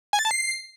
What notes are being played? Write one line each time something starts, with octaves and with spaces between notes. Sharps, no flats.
G#5
A6
A5
C7